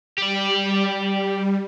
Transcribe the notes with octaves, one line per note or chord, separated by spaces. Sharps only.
G3 G4 D5